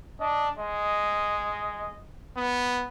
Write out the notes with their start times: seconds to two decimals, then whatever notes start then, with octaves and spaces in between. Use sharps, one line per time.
0.20 D4 D#5
0.58 G#3 D#5
2.37 B3